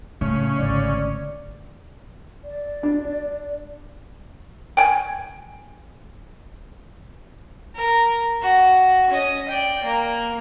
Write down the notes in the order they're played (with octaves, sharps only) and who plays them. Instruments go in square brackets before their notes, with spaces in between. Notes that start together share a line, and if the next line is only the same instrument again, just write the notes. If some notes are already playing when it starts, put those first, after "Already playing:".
[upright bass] A2 [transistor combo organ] C#3 C#4 [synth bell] A3
[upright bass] G#1 D3 [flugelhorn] D5
[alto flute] D5
[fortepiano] D4
[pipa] G5 G#5
[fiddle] A#4
F#4
C#4 D#5
D5 G5
A#3